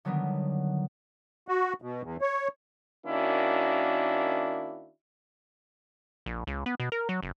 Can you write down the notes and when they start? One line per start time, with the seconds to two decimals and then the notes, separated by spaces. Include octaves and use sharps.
0.05 D3 D#3 F#3 G3 B3 D4
1.48 F#4
1.82 B2
2.03 E2
2.21 C#5
3.06 D#3 A#3 C#4 D4 E4 F#4
6.26 A#1
6.47 C#2
6.66 B3
6.80 B2
6.92 A#4
7.09 F#3
7.23 F#1